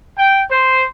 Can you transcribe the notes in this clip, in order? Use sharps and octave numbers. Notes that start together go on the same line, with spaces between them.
G5
C5